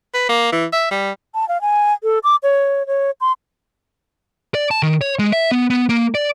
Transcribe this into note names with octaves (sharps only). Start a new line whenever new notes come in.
B4
A#3
E3
E5
G3
A5
F5
G#5
A4
D6
C#5
C#5
C6
D5
A5
D#3
C#5
G#3
E5
B3
B3
A#3
D5